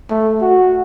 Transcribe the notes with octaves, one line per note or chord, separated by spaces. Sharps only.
A3
F#4